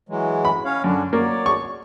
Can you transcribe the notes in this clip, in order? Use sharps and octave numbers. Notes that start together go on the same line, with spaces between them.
E3 F#3 G#3
B5
C#4 C#5 F5
F#2 D3 D4 F#4
F#3 A#3 C#5 D5
C#6